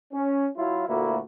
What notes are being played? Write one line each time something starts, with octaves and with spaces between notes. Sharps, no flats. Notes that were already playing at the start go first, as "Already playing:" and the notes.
C#4
F#3 E4 F4
D2 A#2 A3 A#3 E4 F#4